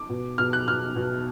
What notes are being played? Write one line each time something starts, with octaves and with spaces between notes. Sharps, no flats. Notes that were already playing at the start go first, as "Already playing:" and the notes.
Already playing: D6
B2
B2 F6
F#6
B2 F6
B2